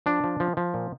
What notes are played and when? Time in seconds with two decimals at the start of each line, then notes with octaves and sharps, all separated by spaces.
0.06 F3 D4
0.24 F3
0.40 F3
0.57 F3
0.74 A#2